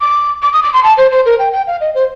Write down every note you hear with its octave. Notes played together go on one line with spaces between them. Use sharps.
D6
D6
D#6
D6
C6
A5
C5
C5
A#4
G5
G5
F5
D#5
C5